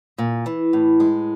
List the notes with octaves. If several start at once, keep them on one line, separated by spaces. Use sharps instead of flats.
A#2
E3
A2
G#3